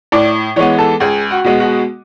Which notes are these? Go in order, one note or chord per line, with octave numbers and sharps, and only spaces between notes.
A2 D5
E3 G#3 B3 C#5
A4
C#2 G#4
F#4
B2 G#3 B3
F#4